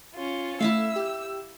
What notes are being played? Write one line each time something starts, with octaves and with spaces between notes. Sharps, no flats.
C#4 F4
A3 E4 E5 F5 E6
G4